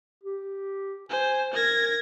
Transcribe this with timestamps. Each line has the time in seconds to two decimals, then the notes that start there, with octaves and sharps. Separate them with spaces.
0.23 G4
1.10 C5 G#5
1.54 A#4 G#6 A#6